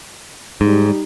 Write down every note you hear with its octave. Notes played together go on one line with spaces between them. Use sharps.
G#2 G3 D#4